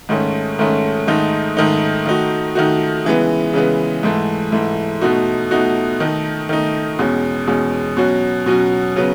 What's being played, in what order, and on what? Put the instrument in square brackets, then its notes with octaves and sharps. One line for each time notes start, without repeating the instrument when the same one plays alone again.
[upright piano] G#2 D#3 A3 C#4
G#2 D#3 A3 C#4
G#2 D#3 A3 D#4
G#2 D#3 A3 D#4
D#3 A3 D#4 F#4
D#3 A3 D#4 F#4
C#3 E3 G#3 B3
C#3 E3 G#3 B3
G#2 E3 A3
G#2 E3 A3
B2 A3 D#4 F#4
B2 A3 D#4 F#4
D#3 A3 D#4
D#3 A3 D#4
E2 B2 G#3 C#4
E2 B2 G#3 C#4
B2 F#3 C#4 F#4
B2 F#3 C#4 F#4
C#3 F#3 B3